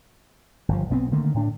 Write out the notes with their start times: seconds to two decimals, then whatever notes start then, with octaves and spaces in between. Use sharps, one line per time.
0.68 G1 G2 F3
0.90 B1 B3 C4
1.12 D3 D#3 A3 A#3
1.34 A2 D4